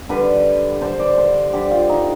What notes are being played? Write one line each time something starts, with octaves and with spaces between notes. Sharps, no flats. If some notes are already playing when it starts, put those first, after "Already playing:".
D3 G3 B4
D3 G3 C5
D5
C5
D3 G3 G4
F4
D#4